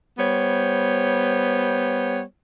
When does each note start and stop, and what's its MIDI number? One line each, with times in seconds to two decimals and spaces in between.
0.18 2.21 55
0.18 2.21 59
0.18 2.21 72
0.18 2.21 73